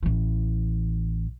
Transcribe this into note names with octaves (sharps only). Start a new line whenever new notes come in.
A1 E3